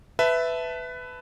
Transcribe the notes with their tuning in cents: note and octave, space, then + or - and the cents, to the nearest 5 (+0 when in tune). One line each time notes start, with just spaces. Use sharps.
B4 +15 E5 +0 A5 +0